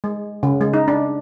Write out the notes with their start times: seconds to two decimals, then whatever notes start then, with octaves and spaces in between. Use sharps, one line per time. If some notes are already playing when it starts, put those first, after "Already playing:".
0.04 G#3
0.43 C#3
0.61 G#3
0.74 D#4
0.88 D4